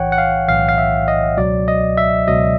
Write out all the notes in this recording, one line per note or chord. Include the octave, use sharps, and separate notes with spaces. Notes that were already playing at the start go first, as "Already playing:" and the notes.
Already playing: B1 A2 E3 C#5 F#5 G5
F#5
F5
B1 A2 E3 F5
F5
E5
D#5
C#2 B2 F#3 D5
D#5
E5
C#2 B2 F#3 D#5